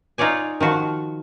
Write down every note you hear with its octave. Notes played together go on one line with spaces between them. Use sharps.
D#4 F4 C#5 D5 G#5
D#3 F3 F#4 A5